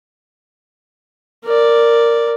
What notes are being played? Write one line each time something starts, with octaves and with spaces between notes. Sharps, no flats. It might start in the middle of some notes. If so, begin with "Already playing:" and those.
A#4 D5